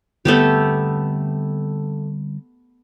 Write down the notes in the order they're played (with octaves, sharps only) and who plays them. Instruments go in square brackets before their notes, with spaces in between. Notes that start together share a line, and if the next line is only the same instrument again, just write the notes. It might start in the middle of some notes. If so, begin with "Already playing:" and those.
[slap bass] D3 G3 C4 [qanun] A3 B3 G4